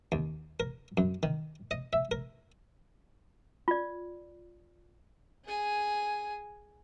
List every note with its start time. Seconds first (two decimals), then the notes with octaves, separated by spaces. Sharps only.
0.12 D#2
0.60 A#4
0.97 F#2
1.23 D#3
1.71 D#5
1.93 E5
2.11 A#4
3.68 F4 D5
5.45 G#4 G#5